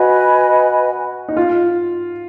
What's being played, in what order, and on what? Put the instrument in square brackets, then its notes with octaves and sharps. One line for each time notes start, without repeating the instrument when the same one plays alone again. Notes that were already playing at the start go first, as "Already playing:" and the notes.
Already playing: [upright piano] F#4 [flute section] B4 D#5 G#5 B5
[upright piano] D#4
F4